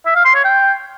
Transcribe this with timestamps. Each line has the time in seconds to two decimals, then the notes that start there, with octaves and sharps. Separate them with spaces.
0.06 E5
0.15 F5
0.25 C6
0.35 C#5
0.44 G5